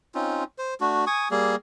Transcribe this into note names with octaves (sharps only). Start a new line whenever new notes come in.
C4 C#4 D#4 F4
C5
A3 D4 F#4
G#5 C#6 D#6
G3 A#3 G#4